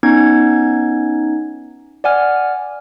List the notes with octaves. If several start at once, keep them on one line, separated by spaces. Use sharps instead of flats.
B3 C#4 D#4 G#6
D5 F#5 G#5 F6